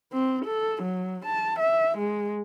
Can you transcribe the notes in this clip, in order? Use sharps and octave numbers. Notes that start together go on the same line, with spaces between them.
C4
A4
F#3
A5
E5
G#3